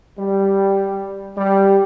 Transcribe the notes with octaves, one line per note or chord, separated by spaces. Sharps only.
G3
G3